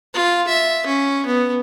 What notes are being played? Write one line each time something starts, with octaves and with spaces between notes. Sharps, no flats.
F4
E5
C#4
B3